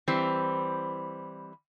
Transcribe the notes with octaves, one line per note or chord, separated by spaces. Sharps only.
E3 G3 C4